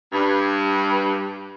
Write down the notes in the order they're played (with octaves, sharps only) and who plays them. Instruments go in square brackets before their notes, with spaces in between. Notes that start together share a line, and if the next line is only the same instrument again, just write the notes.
[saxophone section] G2